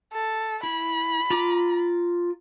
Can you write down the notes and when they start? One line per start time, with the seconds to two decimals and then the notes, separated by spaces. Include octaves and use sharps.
0.13 A4
0.63 E4 B5
1.30 F4 A#5 D6